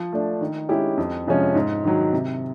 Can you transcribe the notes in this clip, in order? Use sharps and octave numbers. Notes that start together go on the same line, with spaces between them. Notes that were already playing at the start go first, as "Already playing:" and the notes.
Already playing: F3
A3 D4
D#3
G#3 C#4 E4 G4
F2
C3 F3 G#3 C#4
G#2
D#3 F#3
C3